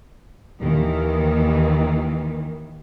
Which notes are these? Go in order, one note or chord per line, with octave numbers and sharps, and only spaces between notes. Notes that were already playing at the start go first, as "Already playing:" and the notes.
D#2 D#3 E3 A#3